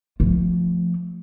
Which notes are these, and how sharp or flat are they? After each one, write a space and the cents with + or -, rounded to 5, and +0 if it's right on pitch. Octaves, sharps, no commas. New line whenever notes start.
F3 +0 A3 +0